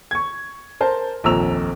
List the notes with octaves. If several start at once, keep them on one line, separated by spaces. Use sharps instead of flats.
C#6 G#6
A#4 C5 A5
F1 A#1 D#2 A#5 E6 F7